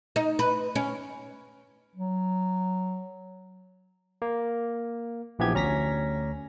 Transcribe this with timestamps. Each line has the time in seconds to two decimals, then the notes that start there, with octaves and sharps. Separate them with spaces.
0.16 D#4
0.39 B4
0.75 C#4
1.96 F#3
4.22 A#3
5.39 A#1 E3 F3 B3 G4 G#6
5.54 D2 C#4 A#5 A#6 B6